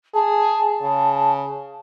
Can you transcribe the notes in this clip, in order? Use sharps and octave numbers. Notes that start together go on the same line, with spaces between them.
G#4 A5
C#3